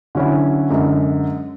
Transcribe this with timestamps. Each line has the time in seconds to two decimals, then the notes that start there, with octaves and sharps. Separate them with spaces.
0.15 D3 F#3 C#4 E4
0.70 F#2 D3 G#3